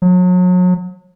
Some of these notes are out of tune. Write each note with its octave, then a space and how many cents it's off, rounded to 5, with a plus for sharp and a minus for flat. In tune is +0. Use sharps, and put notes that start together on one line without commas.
F#3 -35